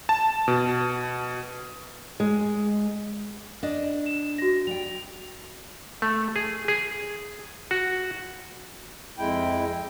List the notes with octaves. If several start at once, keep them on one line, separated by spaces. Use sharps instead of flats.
A5
B2
G#3
D4 D#5
E7
F#4 A#6
G3 G5 F7
A3
G#4
G#4
F#4
F2 G#3 E4 G5